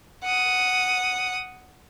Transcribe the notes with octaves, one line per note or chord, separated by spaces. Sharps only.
F#5 D#6